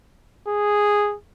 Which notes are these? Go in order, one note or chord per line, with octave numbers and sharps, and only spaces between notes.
G#4